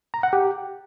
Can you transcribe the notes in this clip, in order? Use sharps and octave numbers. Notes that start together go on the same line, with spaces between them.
A#5
F#5
G4